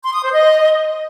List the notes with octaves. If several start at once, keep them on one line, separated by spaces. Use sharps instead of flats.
C6
D#6
C5
D#5